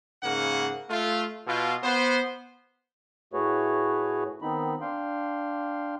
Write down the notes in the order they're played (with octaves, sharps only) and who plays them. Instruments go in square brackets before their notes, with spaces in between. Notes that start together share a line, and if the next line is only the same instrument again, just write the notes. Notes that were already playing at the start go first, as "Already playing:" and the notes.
[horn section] G#2 C#3 A#3 F#5
A3 F4
B2 F4
B3 C5
[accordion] A2 A3 F#4 G#4 B4 C#5
D#3 B3 C4 D#4 B5
D4 F5 G5 C6